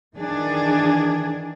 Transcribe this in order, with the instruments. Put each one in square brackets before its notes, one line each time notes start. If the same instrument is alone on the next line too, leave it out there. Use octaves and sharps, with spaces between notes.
[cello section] D#3 E3 D4 G#4